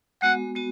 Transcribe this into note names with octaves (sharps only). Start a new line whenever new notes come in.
G#3 B3 F#4 F#5
G#3 B3 F#4